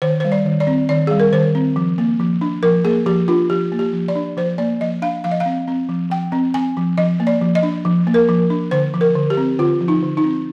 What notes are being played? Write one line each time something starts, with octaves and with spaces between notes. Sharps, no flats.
D#3 C5
G3 C5
D5
D#3
D5
C4
D#3 D5
G3 G#4
A#4
D#3 C5
C4
F3
A#3
F3
D4
F3 A#4
A#3 G#4
F3 G4
D4 F4
F3 G4
A#3
G4
F3
D5
D4
F3 C5
A#3 D5
F3 D#5
D4 F5
F3 F5
D#5
F5
C4
C4
F3
F3 G5
C4
C4 G#5
F3
F3 D#5
A#3
D5
F3
D#5
D4
F3
A#3
A#4
F3
D4
D3 C5
F3
A#4
D3
G4
C4
D3 F4
F3
D#4
D3
D#4
C4